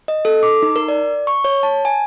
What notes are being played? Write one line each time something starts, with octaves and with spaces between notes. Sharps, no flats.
D#5
A4
D6
D#4
A#4
D5
C#6
C#5
A5
G#5